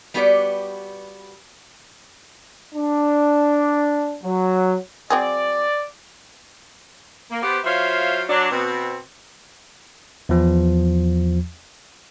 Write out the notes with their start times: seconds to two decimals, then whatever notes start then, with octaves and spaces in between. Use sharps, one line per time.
0.14 G3 B3 F#4 G4 B4 D5
2.75 D4
4.24 F#3
5.10 F#3 C4 G#4 D5
7.30 A#3
7.42 B3 G4 C5
7.64 F#3 F4 C5 C#5 E5 F5
8.29 F#3 D4
8.51 B2 C4
10.29 E2 F3